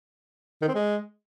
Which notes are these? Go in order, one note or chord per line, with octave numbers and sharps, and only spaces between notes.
D#3
C4
G#3